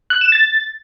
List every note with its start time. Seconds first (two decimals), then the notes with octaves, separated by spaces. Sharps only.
0.10 F#6
0.21 E7
0.32 A6